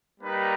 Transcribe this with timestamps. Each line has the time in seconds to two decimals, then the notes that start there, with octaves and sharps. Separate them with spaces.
0.20 G3 A#3 D#4 B4